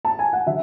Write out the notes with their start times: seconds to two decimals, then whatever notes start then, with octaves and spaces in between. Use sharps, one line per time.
0.05 A5
0.19 G#5
0.33 F#5
0.46 D3 F#3 E5